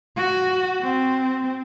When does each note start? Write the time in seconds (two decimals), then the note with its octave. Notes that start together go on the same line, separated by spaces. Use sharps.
0.17 F#4
0.81 C4